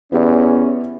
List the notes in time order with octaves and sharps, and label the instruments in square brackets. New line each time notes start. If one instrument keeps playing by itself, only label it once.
[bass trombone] E2 [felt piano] B3 G4 D5 [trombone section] C#4